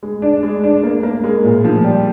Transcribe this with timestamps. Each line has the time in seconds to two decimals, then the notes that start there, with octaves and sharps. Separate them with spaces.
0.03 G#3
0.22 D4
0.43 G#3
0.64 D4
0.83 A#3
1.03 A#3
1.24 G#3
1.44 A#2
1.64 F3
1.84 G3